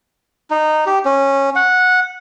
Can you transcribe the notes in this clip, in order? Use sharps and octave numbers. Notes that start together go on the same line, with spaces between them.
D#4
G4
C#4
F#5